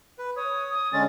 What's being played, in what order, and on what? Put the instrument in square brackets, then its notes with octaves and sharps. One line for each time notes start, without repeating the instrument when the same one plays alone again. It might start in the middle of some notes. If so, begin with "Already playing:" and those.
[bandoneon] B4
[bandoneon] C#5 [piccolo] D#6
[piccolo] D#6
[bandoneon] D3 G#3 C#4 [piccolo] A6